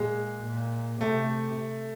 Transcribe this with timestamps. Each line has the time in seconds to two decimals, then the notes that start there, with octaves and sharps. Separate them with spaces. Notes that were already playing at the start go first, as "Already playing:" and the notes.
Already playing: A#2 G#3
0.46 A#2
1.01 C3 A3